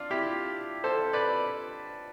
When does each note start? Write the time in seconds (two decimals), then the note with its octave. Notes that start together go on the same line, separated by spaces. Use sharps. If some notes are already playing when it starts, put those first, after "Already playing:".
Already playing: D4 F4
0.11 E4 G4
0.84 A4 C5
1.13 B4 D5